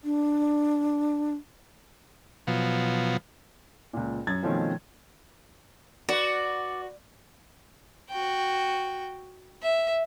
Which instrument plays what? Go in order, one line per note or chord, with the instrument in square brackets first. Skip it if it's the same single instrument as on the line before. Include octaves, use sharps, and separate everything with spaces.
[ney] D4
[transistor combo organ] B2 F3 F#3
[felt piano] C#2 A#2
F#2 G#6 A6
B2 D#3 F3 A3 C4 C#4
[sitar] F#4 B4 [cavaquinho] D5
[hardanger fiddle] F#4 G5
E5